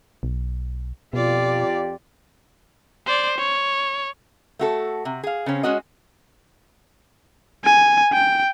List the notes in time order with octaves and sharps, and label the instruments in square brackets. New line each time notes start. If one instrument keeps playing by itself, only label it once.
[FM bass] B1
[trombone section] F2 G4 [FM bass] B2 [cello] F4 D5
[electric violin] C5 D5
C#5
[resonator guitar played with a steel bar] A3 F#4 A4
C3
G#4 F5
C#3 C4 C#4
G#3 C#4 F#4 D#5
[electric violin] G#5
G5